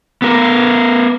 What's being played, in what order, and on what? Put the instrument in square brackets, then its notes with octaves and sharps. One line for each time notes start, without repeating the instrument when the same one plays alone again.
[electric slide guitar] B3 A#4